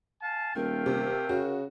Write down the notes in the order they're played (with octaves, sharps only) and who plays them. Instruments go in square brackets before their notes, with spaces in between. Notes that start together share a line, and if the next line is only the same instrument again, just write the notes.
[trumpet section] F5 G#5 A5
[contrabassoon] D#1 [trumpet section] A3 F4 G5 [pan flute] A#4
[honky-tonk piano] C3
[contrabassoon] C#3 [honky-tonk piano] F#4